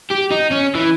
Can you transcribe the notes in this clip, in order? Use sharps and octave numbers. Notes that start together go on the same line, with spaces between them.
G4
D#4
C#4
E3